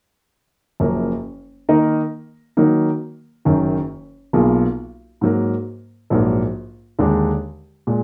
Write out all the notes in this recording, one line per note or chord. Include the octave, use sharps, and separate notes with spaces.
F#1 F#2 F3 A#3
D#3 A#3 D#4 A#4 D#5
D#3 F#3 A#3 D#4
F#1 F#2 D#3
B1 B2 A#3 F4 G#4
G#2 F#3 A#3
A#1 G#2 F#3 A#3
D#2 D3 G#3 D4
A#2 G#3